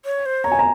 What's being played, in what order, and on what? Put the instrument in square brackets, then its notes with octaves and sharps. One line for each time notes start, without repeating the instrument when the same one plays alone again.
[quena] C#5
C5
[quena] C#5 [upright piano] A#5
[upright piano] G#5
A#5